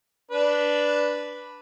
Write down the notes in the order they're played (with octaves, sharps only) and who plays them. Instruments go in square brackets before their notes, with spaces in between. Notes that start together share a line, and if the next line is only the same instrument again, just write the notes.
[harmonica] D4 B4